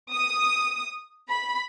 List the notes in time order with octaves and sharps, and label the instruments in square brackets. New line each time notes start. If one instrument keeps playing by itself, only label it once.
[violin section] D#6
B5